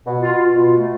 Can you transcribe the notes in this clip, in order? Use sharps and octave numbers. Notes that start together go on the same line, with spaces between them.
B2
F4
F4
B2
A3